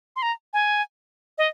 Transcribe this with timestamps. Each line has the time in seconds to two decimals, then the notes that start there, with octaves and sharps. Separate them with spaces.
0.16 C6
0.22 A#5
0.53 G#5
1.38 D#5